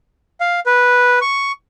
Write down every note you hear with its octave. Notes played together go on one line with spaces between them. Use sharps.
F5
B4
C#6